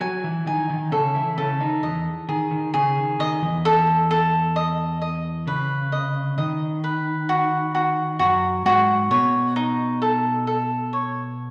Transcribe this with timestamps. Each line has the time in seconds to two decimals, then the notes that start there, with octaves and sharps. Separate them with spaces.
0.01 F#3 F#4 G#5
0.24 E3 E4
0.46 D#3 D#4 G#5
0.69 D#3 D#4
0.92 C#3 C#4 A4
1.14 E3 E4
1.38 C#3 C#4 A4
1.60 D#3 D#4
1.83 E2 E3 D#5
2.29 D#3 G#4
2.51 D#3
2.74 C#3 G#4
2.97 D#3
3.19 D#3 D#5
3.42 E2 E3
3.65 A4
4.11 A4
4.56 D#5
5.02 D#5
5.47 C#3 B4
5.92 D#5
6.38 D#3 D#5
6.84 B4
7.29 F#4
7.75 F#4
8.19 F#2 F#3 F#4
8.65 G#2 G#3 F#4
9.10 B2 B3 C#5
9.56 D#4
10.02 A4
10.47 A4
10.93 C#5